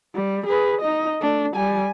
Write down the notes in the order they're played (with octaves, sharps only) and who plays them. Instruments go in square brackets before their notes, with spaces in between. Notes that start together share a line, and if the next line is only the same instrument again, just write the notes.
[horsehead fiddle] G3
G#4 B4
D#4 D#5
A3 D4
G3 G#5